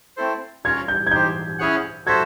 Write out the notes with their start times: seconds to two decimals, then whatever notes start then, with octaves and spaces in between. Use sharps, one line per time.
0.17 A3 C4 E4 A4 C5
0.64 C#4 F4 A#4 C#5 G#6
0.88 G6
1.07 G#6
1.11 D#4 G4 C5 G6
1.59 C#4 E4 G#4 C#5 F#5
2.06 F#4 A4 C5 E5 G#6